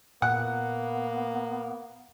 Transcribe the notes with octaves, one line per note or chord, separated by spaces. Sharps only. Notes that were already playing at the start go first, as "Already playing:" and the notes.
A#2 A#3 B3 F#5